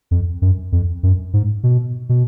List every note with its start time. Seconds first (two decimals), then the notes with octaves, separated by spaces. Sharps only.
0.11 F2
0.42 F#2
0.72 F2
1.03 F#2
1.33 G#2
1.63 B2
2.09 B2